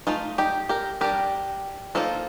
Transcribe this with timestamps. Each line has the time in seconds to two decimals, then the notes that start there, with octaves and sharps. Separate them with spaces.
0.07 A3 D#4 F4
0.38 D#4 G4
0.69 G4 A#4
1.01 G3 D4 G4 A#4
1.95 F3 A#3 D#4 F4 A4